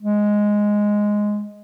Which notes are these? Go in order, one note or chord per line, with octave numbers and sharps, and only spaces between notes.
G#3